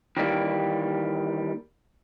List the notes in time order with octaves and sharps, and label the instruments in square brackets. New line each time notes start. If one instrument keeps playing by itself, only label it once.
[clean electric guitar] D#3 E3 G3 A#3